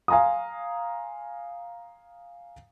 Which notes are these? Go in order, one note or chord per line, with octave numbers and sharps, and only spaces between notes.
F5 G#5 A#5 C6 D#6